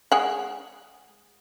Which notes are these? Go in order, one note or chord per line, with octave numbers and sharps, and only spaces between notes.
G#3 G#4 F#5